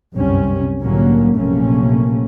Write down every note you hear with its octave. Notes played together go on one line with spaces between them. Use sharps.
G1 C2 F#2 C3 G3 C#4
C2 A2 D3 F#3 A#3 C#4
A#1 F#2 C3 A3 A#3 C#4